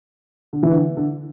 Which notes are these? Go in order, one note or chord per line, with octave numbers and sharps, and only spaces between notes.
D3
E3
D3
D3